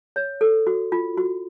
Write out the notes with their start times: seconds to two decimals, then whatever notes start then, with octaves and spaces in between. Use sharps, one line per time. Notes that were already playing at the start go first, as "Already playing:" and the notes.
0.16 C#5
0.41 A4
0.67 F#4
0.92 F4
1.17 F#4